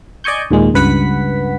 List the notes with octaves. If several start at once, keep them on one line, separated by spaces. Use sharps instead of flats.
D5 D#5 G#5 C#6 G6
D#2 A#2 G#3
C#2 G2 B4 F#5 B6